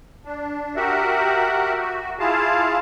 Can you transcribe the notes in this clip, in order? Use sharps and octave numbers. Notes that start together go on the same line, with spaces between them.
D4
F#4 G4 A#4 E5 F#5
F#4
E4 F4 G#4 F5 A5